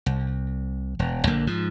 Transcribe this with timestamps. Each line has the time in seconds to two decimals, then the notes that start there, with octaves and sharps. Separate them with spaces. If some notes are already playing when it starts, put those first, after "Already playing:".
0.06 C2
0.99 E1
1.27 A#1 D3 A#3
1.47 G#2 F3